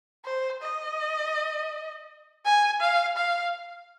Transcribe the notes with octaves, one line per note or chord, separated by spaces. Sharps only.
C5
D#5
G#5
F5
F5